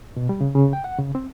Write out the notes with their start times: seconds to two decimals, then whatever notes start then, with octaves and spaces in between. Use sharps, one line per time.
0.16 B2
0.29 G3
0.41 C#3
0.55 C#3
0.73 G5
0.84 F#5
0.99 C#3
1.15 C4